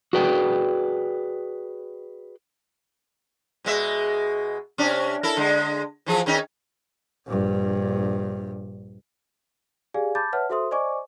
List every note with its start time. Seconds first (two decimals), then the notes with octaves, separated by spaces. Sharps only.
0.13 F#4 G#4 B4 D5 G5
3.64 B2 G#3 E5
4.78 C3 C#4 D4
5.23 E4 A4 A#4
5.37 D3 G#3
6.06 E3 F3 G#4
6.26 D#3 C#4 D#4
7.26 A#1 G2
9.94 G4 G#4 D5 F5 G#5
10.15 A5 B5 D6 G6 A6
10.33 B4 C#5 E5 F#5 A5 F6
10.50 F#4 A4 C5 E5 C6 D#6
10.71 C5 D5 D#5 G#5 C#6 D6